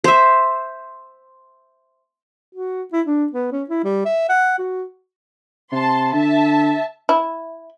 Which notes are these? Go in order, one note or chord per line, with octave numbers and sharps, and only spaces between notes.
C5 E5
F#4
E4
D4
B3
C#4
E4
G3
E5
F#5
F#4
C3 A5 C6
D3 E5 A5
E4